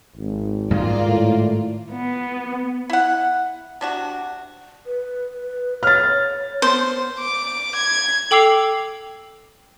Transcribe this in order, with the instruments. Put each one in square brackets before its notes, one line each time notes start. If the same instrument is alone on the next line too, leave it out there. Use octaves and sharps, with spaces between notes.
[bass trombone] G#1
[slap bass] G#2 D#3 G#3 [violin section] A#3 F4 D5
[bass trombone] A2
[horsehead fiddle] B3
[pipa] E4 F#5
C3 D4 F#4
[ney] B4
[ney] C#5 [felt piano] F6 A6
[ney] B3 [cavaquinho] C5
[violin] D6
G#6
[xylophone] A4 G5 D6 E6 C7 F7